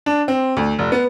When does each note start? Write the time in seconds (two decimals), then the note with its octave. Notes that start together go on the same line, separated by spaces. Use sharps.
0.06 D4
0.28 C4
0.57 D2
0.79 F1
0.92 B3